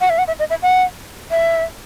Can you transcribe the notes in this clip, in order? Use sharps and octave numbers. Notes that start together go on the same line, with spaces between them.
F#5
E5
F#5
E5
D#5
E5
F#5
E5